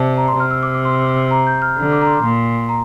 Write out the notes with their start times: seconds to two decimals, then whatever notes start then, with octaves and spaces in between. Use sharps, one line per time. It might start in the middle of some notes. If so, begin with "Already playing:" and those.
Already playing: C3 D5 A5
0.17 A#5
0.28 C6
0.39 C3 F6
0.51 E6
0.63 D6
0.74 D6
0.85 C6
1.31 A#5
1.47 G6
1.62 F6
1.77 D3
1.92 D6
2.02 A#5
2.07 C6
2.23 A#2 C6
2.69 A#5